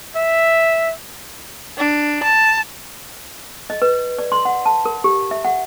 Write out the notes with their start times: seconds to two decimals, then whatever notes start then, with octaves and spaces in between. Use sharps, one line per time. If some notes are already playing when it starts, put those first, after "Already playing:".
0.16 E5
1.78 D4
2.23 A5
3.70 D#5
3.82 B4
4.19 D5
4.32 C6
4.45 F#5
4.66 A5
4.85 A#4
5.04 G4
5.31 E5
5.45 F#5